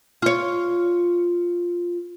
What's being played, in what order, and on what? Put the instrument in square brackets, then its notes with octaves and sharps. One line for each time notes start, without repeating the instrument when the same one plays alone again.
[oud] F4 C#5